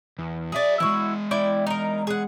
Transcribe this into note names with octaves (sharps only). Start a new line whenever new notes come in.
E2
F#3 G#4 D5 E5
E3 G#3 E4 F#4
E4 D5 G5
D#4 A#4
G#4 F#5